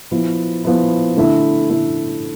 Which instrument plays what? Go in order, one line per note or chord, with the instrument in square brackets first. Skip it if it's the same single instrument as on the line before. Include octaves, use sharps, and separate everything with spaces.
[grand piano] F3 B3 E4
F3 B3 E4
D3 A3 E4 A4 E5
D3 A3 E4 A4 E5